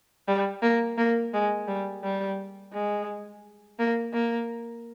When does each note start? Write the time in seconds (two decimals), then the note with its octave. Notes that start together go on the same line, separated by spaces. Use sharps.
0.28 G3
0.62 A#3
0.98 A#3
1.33 G#3
1.67 G3
2.03 G3
2.73 G#3
3.79 A#3
4.13 A#3